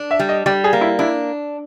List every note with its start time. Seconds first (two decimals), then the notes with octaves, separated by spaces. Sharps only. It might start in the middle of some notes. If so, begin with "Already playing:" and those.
Already playing: D4
0.11 E5
0.19 G3
0.29 D#5
0.46 G3 D5
0.64 G#4
0.73 A#3
0.81 E4
0.99 D4 E4